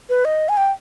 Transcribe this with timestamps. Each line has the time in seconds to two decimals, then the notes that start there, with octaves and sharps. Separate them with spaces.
0.09 B4
0.25 D#5
0.49 G#5
0.57 G5